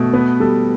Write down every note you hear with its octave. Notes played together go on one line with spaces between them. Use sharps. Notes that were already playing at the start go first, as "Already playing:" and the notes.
Already playing: B2 A3
B3 B4
G3 A4